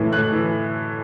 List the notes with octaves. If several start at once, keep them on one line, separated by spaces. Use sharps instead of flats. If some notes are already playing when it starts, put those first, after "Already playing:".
Already playing: A2 E3
A2 F#6
E3